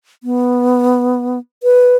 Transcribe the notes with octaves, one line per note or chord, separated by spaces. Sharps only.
B3
B4